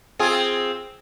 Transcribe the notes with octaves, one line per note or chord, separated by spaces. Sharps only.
C4 F4 G#4